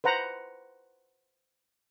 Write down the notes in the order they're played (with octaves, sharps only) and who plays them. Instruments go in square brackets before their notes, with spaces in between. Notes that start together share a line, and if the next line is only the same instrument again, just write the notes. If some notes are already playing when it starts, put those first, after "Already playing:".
[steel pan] B4 C5 F#5 A#5